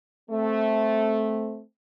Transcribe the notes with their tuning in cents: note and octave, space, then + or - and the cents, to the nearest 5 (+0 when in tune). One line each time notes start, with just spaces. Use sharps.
A3 -5 C4 +0